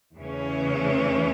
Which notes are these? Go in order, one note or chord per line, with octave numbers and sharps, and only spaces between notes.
E2 C#3 E3 A3 C#4